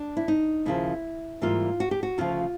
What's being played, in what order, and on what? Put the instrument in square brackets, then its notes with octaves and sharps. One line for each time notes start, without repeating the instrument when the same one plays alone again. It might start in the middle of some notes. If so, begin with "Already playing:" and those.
Already playing: [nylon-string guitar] D4
E4
D#4
D#2 C#3 F3 E4
G#2 E3 G3 A#3 F4
F#4
G4
F#4
D2 C#3 F3 F4